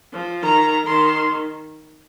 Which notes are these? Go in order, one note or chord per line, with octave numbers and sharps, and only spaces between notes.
F3
D#3 A#5
D#3 C6